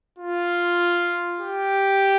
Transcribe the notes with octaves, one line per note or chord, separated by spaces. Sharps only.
F4
G4